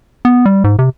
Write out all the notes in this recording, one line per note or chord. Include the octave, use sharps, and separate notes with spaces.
B3
G3
G#2
C3